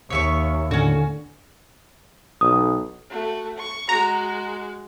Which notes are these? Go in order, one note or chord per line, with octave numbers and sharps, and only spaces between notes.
D#2 C#5 E5 C#6
A2 D3 C#4 F#4
B1 D#6
A3 F#4
C#6
G#3 F#4 A#5